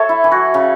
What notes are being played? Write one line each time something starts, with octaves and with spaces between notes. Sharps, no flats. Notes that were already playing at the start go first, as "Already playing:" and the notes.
Already playing: A4 C#5 E5
E4
E3
F#4
C#3